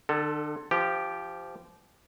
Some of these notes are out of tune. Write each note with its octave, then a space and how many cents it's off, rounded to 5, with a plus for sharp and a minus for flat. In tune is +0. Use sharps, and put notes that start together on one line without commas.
D3 +35 A4 +0
F3 -25 G4 +0